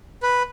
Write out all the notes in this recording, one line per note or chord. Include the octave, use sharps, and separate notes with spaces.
B4